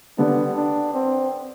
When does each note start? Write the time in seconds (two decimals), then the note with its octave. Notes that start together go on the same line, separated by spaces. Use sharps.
0.18 D3 G3 B3 D4
0.57 D4
0.94 C4